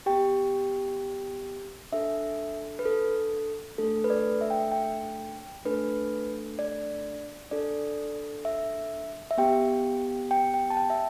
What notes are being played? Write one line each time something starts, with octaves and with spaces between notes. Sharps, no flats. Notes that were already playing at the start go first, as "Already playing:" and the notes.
B3 G4 G5
D4 A4 E5
B4
A4
A3 D4 A4
B4
D5
E5
G5
E5
G5
A3 D4 A4 B4
D5
D4 A4 D5
E5
E5
B3 G4 G5
G5
G5
A5
G5
E5